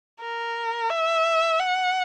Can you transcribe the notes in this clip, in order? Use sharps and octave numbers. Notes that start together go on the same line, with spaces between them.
A#4
E5
F#5